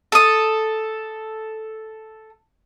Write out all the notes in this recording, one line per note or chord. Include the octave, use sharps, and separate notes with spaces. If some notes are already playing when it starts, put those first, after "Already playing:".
A4 D#6